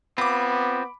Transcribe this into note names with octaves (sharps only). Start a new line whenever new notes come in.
B3 C4 F4 B5 D6